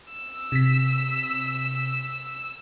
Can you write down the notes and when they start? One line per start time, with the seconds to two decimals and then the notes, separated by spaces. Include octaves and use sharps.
0.12 E6
0.52 C3 B6